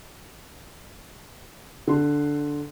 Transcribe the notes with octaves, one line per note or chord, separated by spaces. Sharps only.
D3 C6